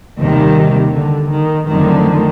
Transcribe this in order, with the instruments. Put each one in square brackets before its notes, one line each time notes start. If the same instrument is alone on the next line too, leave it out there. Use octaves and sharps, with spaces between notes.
[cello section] D#2 D#3 G3 [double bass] C3
[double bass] C3
D3
D#3
[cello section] F2 D3 F#3 A3 [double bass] D#3